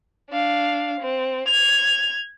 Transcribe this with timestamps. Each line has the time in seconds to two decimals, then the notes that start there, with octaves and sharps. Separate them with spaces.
0.29 D4 F5
1.00 C4
1.47 G#6 F7